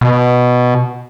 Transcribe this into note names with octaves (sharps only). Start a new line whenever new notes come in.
B2